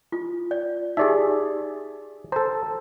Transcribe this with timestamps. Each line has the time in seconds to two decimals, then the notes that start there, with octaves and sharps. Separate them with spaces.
0.12 F4
0.51 D5
0.97 D#4 G4 G#4 D5 E5
2.32 A4 C5 A#5